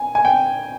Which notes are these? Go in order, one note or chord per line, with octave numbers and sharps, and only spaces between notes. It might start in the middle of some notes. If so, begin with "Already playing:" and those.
Already playing: G#5
G#5
G5